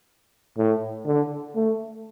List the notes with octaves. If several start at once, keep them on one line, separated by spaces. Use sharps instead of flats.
A2
D3
A3